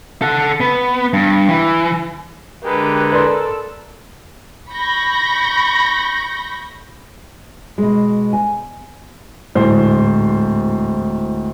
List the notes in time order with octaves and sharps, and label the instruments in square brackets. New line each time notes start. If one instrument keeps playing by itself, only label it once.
[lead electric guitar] A4 F#5
B3
G2
E3
[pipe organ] D3 G#3 [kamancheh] G4 B4 [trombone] A#4
[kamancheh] A4 [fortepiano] B4 D5 C6
[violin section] B5 C#6 G6 A#6
[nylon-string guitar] B2 G#3
G#5
[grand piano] D1 G#2 C5